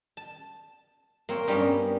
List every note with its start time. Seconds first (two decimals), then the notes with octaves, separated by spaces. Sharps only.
0.17 A5
1.29 A#3 C4 C#5
1.48 G2 G3 A#3 B3 C#4